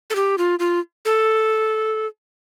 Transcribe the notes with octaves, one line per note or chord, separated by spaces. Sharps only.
A4
G4
F4
F4
A4